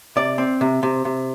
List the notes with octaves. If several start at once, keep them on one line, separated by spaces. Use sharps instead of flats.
C3 D5
C4
C3
C3
C3